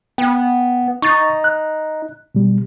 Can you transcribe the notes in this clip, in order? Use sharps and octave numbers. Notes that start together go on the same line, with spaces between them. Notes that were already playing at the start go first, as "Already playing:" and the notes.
B3 G5
D#4 C#6 A6
F#6
B2 G3